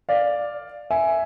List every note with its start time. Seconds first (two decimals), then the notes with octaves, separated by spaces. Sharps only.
0.09 D5 F5
0.91 E5 G#5